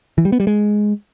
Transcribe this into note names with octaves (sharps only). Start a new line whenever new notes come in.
E3
G3
B3
G3
G#3